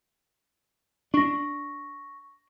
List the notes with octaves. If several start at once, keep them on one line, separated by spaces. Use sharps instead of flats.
D4 C#6 A#6